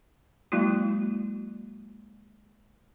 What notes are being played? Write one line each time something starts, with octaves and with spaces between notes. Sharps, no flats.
F#3 G#3 A#3 E4 F#4